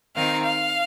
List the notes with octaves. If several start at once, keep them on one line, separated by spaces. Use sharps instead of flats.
D#3 C4 D#4 F5
F5